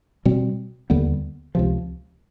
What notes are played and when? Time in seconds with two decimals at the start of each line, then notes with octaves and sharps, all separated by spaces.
0.25 B2 G3 C4
0.90 D#2 D3 G3 B3
1.55 C#2 C3 F3